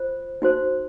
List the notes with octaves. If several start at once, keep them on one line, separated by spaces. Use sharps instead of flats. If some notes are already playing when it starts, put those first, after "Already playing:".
Already playing: F4 C5
D#4 F#4 C5